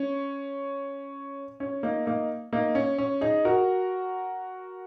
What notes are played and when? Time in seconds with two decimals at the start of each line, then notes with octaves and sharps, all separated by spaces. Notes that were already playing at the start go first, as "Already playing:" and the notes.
Already playing: C#4
1.60 C#4
1.83 A#3 D#4
2.06 A#3 D#4
2.53 A#3 D#4
2.75 C#4
2.98 C#4
3.21 D#4 G#4
3.45 F#4 A#4